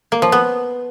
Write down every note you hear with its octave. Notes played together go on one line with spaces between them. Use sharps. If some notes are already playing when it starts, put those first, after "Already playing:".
A#3
F3
B3